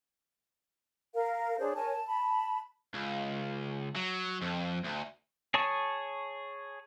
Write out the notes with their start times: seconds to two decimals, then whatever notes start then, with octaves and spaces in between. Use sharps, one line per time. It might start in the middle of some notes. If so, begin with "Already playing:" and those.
1.14 A#4 F5
1.59 D4 G#4 C5 C#5
1.76 A#4 C#5 G#5 A5
1.93 A5
2.09 A5 B5
2.94 C#2
3.96 F#3
4.42 F2
4.84 D2
5.54 G#4 C#5 A5 C#6 D#6